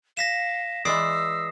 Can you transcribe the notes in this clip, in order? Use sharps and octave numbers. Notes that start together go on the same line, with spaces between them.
F5 A#6 B6 E7
E3 G#3 D5 D#6 E6 C7